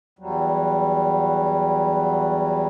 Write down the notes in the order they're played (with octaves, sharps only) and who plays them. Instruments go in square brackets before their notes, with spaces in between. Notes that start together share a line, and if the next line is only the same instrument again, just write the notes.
[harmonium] E2 F#3 G3